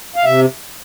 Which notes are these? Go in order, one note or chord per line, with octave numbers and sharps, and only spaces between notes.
F5
C3 E5